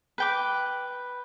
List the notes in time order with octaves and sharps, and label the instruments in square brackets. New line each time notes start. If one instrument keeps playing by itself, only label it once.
[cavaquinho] B4 G5 D6